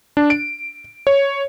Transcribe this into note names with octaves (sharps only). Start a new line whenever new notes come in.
D4
D7
C#5